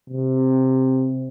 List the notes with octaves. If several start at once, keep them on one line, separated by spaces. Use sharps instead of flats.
C3